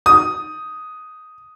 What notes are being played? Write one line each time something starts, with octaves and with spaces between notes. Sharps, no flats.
D#6